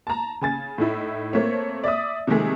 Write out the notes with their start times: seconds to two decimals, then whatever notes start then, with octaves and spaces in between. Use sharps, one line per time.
0.07 A5 A#5
0.41 C#3 G#5 A6
0.78 A2 D#4 E4
1.33 A3 A#3 C4 C#5
1.84 D5 E5 D#6
2.27 C3 D#3 F3 G#3 A3 G#4